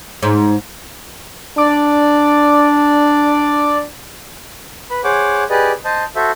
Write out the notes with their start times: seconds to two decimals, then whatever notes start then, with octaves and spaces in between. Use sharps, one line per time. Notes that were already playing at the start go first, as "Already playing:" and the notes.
0.23 G#2
1.58 D4 D5
4.90 B4 B5
5.04 G#4 C5 C#5 F#5 D6
5.50 G4 G#4 B4 D5 D#5
5.85 C5 D#5 A5
6.16 F#4 A4 C5 E5